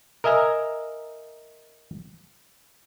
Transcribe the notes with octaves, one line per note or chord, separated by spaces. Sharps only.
A#4 D#5 E5 G#5 A#5